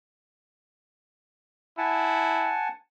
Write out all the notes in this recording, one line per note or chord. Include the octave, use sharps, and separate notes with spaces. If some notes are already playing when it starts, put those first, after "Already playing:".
E4 F#5 G#5 A5